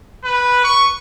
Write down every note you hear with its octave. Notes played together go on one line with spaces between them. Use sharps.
B4
C#6